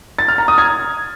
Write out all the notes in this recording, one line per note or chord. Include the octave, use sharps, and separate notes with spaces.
A6
F6
A#5
D#6
G#6